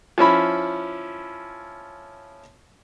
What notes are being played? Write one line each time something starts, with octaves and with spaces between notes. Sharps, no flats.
F3 C#4 E4 B5